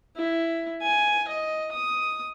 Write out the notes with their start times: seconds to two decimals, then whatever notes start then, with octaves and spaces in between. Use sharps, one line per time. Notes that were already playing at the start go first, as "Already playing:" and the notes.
0.16 E4
0.82 G#5
1.28 D#5
1.71 D#6